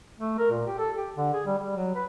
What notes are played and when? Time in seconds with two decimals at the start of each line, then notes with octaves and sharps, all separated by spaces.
0.19 A3
0.38 A#4
0.50 A#2
0.67 G4
0.78 A4
0.96 G4
1.16 D3
1.33 G#4
1.46 G3
1.58 G3
1.76 F#3
1.95 B4